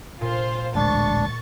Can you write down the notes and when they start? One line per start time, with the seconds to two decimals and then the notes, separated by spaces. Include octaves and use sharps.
0.21 A#2 F4 C5
0.75 A1 D2 G#3 D4 C#6 A6